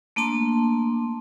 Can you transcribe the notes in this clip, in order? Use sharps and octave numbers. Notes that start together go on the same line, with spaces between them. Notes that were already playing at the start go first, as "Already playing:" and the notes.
A3 A#3 D4 A5 C6